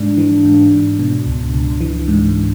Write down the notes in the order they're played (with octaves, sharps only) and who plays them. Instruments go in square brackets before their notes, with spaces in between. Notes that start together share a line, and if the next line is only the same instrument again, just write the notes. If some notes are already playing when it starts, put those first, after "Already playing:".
Already playing: [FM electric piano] G#2 D4
E3
G#2
G#2
B2
C#2
C#2
E3
G#2